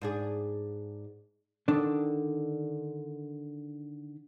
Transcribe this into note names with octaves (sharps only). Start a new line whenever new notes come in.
G#2 D4 G#4
D3 D#3 D4